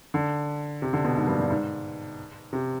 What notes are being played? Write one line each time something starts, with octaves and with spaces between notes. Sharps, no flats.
D3
C3
D3
B2
G#2
G2
G2
G#2
C3